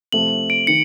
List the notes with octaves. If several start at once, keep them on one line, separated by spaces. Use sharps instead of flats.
C3 F3 A3 F#7
D7
D#3 C#7